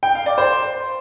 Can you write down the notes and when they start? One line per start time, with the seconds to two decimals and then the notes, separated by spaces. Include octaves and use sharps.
0.03 G5
0.15 F5
0.26 D5
0.38 C5